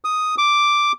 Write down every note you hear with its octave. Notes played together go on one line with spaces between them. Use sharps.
D#6
D6